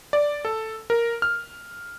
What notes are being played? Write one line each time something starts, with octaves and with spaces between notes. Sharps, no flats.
D5
A4
A#4
F6